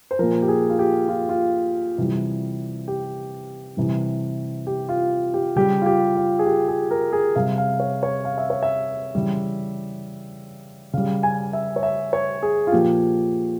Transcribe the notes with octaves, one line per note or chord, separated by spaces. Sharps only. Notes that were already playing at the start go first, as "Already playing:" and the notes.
C5
A#2 F3 A#4
G4
G#4
F4
G4
F4
F4
C3 E3 G3
G4
C3 E3 G3
G4
F4
G4
C#3 G3 G4
F4
G4
F4
G#4
G4
G#4
A#4
G#4
C3 G3 F5
F5
C#5
C#5
F5
E5
C#5
E5
C#3 E3 G3
C#3 G3 F5
G#5
E5
C#5
E5
C#5
G#4
F4
A#2 F3 G4